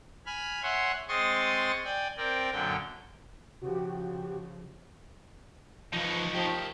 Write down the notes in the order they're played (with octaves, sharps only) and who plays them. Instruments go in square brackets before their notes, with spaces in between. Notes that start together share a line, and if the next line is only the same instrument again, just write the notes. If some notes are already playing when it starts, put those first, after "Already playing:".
[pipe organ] G#5 B5 F6
C#5 E5 F#5 G#5 C6
G#3 C4 C6 C#6 D#6 A6
D5 G5 G#5
C4 A#4 D5 G5
F#2 A#2 D3 G5
[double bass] C#3 F3 [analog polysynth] F#4 G4
[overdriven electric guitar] F3 B4 [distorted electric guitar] D#4 C#5
[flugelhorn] F3 [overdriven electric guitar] G4 A#4